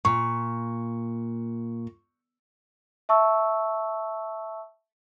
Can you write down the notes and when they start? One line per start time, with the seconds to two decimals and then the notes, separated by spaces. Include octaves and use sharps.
0.05 A#2 C#6
3.09 E5 A5 C#6 E6